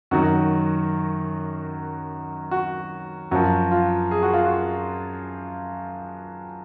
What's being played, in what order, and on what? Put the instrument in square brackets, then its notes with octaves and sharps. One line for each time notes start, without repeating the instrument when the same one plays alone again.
[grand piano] F#2 D#3 F#3 F#4
F#4
F#2 F3 F#4
F4
G#4
F#4
F4
F#4